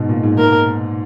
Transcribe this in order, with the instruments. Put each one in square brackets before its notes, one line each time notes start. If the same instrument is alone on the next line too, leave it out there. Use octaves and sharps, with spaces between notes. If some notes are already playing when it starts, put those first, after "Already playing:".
Already playing: [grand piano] G#2 B2
A#2
G#2
[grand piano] G#2 [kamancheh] A#4